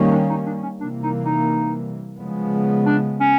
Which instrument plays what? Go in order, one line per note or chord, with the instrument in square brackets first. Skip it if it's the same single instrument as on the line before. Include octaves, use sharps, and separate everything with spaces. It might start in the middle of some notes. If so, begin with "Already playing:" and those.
Already playing: [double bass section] D#3 G3 A#3 C#4
[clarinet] D4
D#4
D4
C#4
[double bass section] C3 E3 G3 A#3 [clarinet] D4
[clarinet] D#4
D#4
[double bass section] C#3 F3 G#3 B3
[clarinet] D4
C#4